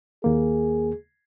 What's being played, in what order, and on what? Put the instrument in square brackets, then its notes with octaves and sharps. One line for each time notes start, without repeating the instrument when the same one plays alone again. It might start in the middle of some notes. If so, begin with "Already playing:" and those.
[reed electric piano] D#2 A#3 [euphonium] G#4